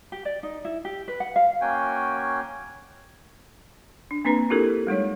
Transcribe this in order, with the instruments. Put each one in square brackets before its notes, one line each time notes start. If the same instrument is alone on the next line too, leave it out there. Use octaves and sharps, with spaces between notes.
[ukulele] G4
D5
D#4
E4
G4
B4
F#5
F5
[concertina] A#3 C#4 F#4 G5 G#5
[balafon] D4
A#3 C4 D4 B4 A#5
D4 E4 F4 G4 A4 A#4
G3 G#3 D#4 C#5